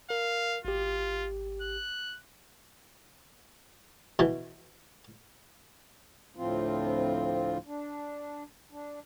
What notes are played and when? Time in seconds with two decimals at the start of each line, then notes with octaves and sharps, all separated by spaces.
0.10 A#4 F5
0.65 G#1 F4 G4
1.62 F#6
4.19 B2 E3
6.37 D2 A2 F3 C4 F4
7.67 D4
8.71 D4